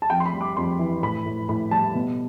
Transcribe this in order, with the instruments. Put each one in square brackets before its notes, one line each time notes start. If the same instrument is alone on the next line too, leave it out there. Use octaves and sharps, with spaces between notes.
[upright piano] A5
F2 G5
C6
B5
G3
D6
F2 C6
E3
A2 B5
A2
A2 B5
G3 A5
B2